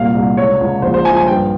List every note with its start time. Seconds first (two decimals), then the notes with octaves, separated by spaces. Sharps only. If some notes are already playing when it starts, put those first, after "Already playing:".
Already playing: C2 A#2 F5
0.15 C2
0.37 C#2 C#5
0.60 C#2
0.82 A#1 C5
0.94 C5
1.05 F3 G#5
1.16 G#5
1.28 G2 G5